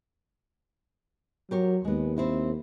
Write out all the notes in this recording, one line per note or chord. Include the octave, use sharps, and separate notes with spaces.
F#3 G4 A#4 C#5
D#2 G#3 B3
C4 E4 A#4